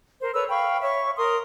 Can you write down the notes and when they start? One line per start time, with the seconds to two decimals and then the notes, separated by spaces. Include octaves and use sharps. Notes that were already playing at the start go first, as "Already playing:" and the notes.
0.21 A#4 C5
0.34 A4 B4 C#5 E6
0.49 F5 G5 B5 C#6
0.82 C#5 E5 C#6
1.17 A#4 C6 D#6